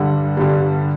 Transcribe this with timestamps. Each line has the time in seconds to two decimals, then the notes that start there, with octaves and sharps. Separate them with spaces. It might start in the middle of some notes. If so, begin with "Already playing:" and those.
Already playing: G2 D3 G3 F#5
0.37 G2 D3 G3